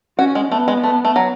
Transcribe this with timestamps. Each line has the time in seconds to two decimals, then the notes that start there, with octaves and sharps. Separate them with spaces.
0.18 C#4 F#4
0.35 G#3
0.51 A3 B3
0.68 G#3
0.83 A3
1.05 A3
1.16 F#3